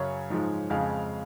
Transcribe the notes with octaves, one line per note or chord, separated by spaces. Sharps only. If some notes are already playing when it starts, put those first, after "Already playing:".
Already playing: F#2 C#3 F#3 C#5
G#2 F3 G#3
F2 C#3 G#3 F5